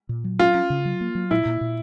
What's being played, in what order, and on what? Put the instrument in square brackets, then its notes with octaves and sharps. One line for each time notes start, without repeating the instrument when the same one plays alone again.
[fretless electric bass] A#2
F#3
[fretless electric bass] C#4 [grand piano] F4
[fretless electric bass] C#4
C#3
F#3
A#3
F#3
[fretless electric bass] A#2 [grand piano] E4
[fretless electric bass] A#2
A#2